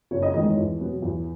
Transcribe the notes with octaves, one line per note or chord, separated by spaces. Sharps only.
F#1 C#5
D#5
E2 D#3 G#3 D#5
C#5
E2
B2 F#3 B3
E2